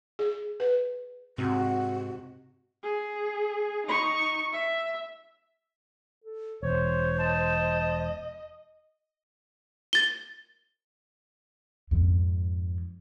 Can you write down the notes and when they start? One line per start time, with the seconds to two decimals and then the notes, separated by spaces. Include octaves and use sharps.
0.19 G#4
0.60 B4
1.38 G#2 C3 F#4
2.84 G#4
3.87 D#4 C#6
4.52 E5
6.24 A4
6.63 E1 C5 C#5
7.19 D#5 A5
9.93 A6 G7
11.91 F2 G#2